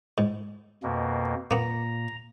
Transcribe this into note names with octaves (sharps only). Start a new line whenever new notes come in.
G#2
F2 B2 A#3
A#2 A#3 B3 A#5